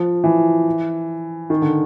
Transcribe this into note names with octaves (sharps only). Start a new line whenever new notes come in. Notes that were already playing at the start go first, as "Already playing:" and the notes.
Already playing: F3
E3
D#3
D3